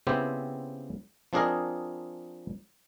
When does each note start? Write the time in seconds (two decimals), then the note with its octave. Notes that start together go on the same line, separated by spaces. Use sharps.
0.07 C#3 B3 C4 E4 G4 C5
1.33 F3 C4 D4 G#4 A#4 D#5